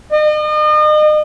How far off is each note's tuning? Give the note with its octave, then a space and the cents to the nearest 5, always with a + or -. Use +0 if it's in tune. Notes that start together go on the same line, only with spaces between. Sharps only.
D#5 -40